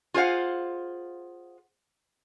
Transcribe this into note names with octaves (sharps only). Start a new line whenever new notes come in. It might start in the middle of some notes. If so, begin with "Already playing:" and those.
F4 G#4 C5 F5 F#5